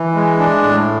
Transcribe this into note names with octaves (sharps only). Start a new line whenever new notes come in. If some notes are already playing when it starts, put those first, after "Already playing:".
Already playing: E3
G#3
D4
A2